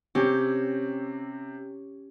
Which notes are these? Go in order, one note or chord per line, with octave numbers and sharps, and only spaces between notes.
C3 C4 C#4 G4